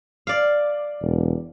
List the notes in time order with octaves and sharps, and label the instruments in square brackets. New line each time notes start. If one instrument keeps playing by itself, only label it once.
[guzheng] D5 F5
[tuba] E1